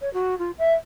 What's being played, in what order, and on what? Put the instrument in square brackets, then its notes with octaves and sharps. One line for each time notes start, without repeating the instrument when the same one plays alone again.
[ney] C#5
F#4
F4
E5